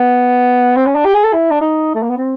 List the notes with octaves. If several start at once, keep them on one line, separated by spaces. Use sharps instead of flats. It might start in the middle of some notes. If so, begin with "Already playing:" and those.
Already playing: B3
C4
C#4
D4
G4
G#4
A4
E4
D4
D#4
A3
A#3
B3
C4